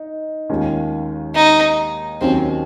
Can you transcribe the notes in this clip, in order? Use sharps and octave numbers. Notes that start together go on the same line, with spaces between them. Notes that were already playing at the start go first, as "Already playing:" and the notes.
Already playing: D#4
D#2 D#3 G#3 C#4 F4
D#4
D#2 D#3 F#3 C4 C#4